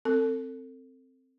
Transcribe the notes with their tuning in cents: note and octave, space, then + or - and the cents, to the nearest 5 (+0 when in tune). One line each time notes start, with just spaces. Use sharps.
C4 +0 A4 +30